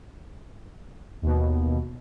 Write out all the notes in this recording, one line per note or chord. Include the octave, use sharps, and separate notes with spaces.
D#2 B2